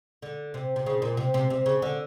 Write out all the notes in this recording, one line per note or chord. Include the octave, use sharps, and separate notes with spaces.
D3
C3
C3
C#3
A#2
C3
C3
C3
C#3
D3